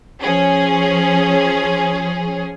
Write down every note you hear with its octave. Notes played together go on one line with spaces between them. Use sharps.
F3 C#4 G#4